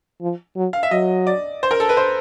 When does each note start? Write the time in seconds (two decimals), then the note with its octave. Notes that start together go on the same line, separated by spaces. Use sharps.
0.21 F3
0.56 F#3
0.73 F5
0.83 E5
0.91 F#3 D#5
1.27 D5
1.63 C5
1.71 A#4
1.80 A4
1.89 B4
1.97 C5